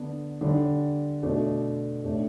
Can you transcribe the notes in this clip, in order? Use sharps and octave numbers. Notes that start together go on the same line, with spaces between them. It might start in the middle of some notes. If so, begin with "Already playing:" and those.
Already playing: D3 B3 D4
D3 G3 D4
B2 A3 D4
A2 A3 D4